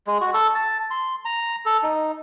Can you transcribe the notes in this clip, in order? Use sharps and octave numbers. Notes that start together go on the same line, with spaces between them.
G#3
F#4
A4
A5
C6
A#5
A4
D#4